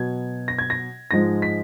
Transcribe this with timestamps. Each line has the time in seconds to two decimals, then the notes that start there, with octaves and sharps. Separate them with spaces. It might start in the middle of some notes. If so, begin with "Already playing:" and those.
Already playing: B2 F#3 G#6
0.48 A#6
0.59 G#6
0.70 A#6
1.11 G#2 F3 G#3 A#6
1.42 B6